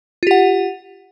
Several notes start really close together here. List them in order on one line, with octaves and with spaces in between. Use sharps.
F4 G4 F#5